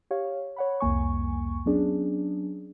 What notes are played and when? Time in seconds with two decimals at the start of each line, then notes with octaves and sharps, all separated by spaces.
0.11 G4 C#5 F5
0.56 C#5 F#5 B5
0.80 C2 F2 A#3 G#5 C#6
1.66 F#3 B3 C#4 D4 G#4